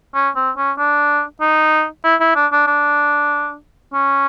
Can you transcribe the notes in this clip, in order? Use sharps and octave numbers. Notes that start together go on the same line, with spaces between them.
C#4
C4
C#4
D4
D#4
E4
E4
D4
D4
D4
C#4